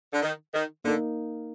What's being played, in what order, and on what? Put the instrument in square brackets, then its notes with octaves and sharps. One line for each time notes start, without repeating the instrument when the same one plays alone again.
[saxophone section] D3
D#3
D#3
[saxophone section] D3 [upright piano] A#3 D#4 A#4